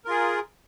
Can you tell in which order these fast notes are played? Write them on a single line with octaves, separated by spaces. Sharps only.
A#4 F4 G#4